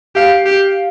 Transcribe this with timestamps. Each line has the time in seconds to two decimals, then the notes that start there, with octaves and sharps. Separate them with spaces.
0.16 G4 F5
0.45 G4